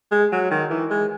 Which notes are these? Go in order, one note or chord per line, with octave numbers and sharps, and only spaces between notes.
G#3
F#3
D#3
E3
G#3